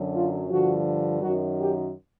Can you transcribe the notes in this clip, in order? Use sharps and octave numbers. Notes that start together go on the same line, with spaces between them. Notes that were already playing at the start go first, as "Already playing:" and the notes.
Already playing: F#2 D3 F#3
F4
G2 D3 F3 F#4
F#2 D#3 F#3 F#4
G4